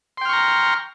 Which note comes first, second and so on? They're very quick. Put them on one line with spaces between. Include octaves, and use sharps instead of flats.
C6 G5 F6 C#6 A#5